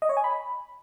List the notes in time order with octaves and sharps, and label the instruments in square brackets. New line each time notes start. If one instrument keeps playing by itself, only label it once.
[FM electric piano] D#5
C#5
G#5
B5